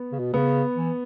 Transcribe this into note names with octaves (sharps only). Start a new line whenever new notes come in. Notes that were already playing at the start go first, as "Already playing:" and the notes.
Already playing: B3
C#3
B2
C#3 B3
E3